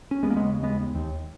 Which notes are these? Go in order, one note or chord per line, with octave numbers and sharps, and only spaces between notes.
C#4
D#2 G#3 B3
A#3
C#3 G#3 B3
D#2 G#3 B3
D#2
D#2